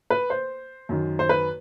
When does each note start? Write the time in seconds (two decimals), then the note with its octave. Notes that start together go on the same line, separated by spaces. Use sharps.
0.10 B4
0.30 C5
0.89 F#2 D#3
1.19 C5
1.29 B4